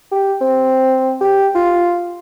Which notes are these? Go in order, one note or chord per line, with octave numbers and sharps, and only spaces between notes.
G4
C4
G4
F4